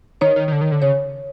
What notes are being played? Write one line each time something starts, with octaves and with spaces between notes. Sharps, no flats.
D#3 C#5
D#3
D#3
D3
D#3
D3
C#3 C#5